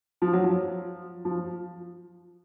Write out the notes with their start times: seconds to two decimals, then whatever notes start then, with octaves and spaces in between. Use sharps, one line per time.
0.22 F3
0.33 F#3
0.43 F3
1.25 F3